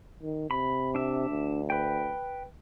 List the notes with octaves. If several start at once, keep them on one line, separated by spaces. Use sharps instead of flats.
D#3
C3 B5
D4 E5
D2
B4 G5